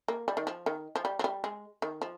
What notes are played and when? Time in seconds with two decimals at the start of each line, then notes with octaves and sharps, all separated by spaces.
0.08 A#3
0.28 G3
0.37 D#3
0.47 F3
0.66 D#3
0.96 F3
1.05 G3
1.19 F3
1.24 G3
1.44 G#3
1.82 D#3
2.02 F3